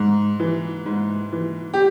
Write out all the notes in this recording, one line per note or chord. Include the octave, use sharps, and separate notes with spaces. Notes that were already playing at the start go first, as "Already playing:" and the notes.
Already playing: G#2
E3
G#2
E3
G4